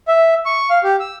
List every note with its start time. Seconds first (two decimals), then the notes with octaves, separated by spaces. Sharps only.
0.08 E5
0.46 C#6
0.70 F5
0.84 G4
1.00 E6